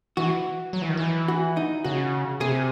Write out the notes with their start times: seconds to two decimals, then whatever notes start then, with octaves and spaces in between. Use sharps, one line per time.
0.17 E3 F#4
0.73 F#3
0.82 E3
0.89 D#3
0.97 E3
1.28 F#4
1.57 D#4
1.84 C#3 F#4
2.40 C3 G#4